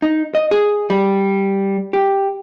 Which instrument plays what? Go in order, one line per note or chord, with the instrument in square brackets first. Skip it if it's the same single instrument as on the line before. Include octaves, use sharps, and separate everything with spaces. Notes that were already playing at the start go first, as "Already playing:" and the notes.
[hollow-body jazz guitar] D#4
D#5
G#4
G3
G4